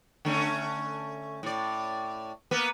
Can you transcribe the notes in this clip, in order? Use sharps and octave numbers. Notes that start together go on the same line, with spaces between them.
D3 A3 C#4
A2 D5
A#3 B3 B4